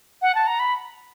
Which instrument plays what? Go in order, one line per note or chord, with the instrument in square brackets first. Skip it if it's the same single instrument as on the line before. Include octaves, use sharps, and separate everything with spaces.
[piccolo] F#5
A5
A#5
B5